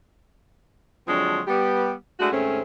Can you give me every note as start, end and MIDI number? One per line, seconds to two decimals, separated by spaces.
1.08 1.41 50
1.08 1.41 53
1.08 1.41 54
1.08 1.41 56
1.08 1.41 60
1.08 1.41 62
1.47 1.93 55
1.47 1.93 59
1.47 1.93 67
2.20 2.30 56
2.20 2.30 57
2.20 2.30 62
2.20 2.30 64
2.20 2.30 66
2.32 2.62 39
2.32 2.62 44
2.32 2.62 57
2.32 2.62 60
2.32 2.62 61